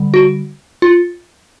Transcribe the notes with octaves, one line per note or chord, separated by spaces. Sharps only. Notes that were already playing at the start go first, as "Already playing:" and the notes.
Already playing: D3 G3
F#4
F4